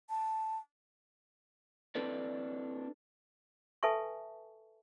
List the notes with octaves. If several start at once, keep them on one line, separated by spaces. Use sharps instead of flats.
A5
C4 D4 E4 A4 B4 D5
A4 B4 E5 G#5 A5 C#6